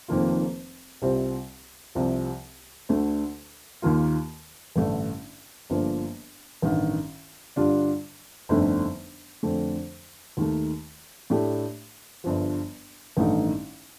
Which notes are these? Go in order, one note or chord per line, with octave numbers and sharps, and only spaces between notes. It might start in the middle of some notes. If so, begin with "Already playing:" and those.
F1 F2 D#3 A#3 F4
C2 C3 G3 C4 F4
C2 C3 F3
D2 D3 A3
D#2 D#3 A#3 F4
A1 G2 D3 A3
G1 G2 F3 A#3
A1 G2 D#3
G2 D3 G3 D4 F4
G1 F2 D3 A3 D#4
F2 D3 A3
D#2 D#3 A3
A2 A3 D4 G4
G1 G2 F3
A1 G2 D#3 A3 D#4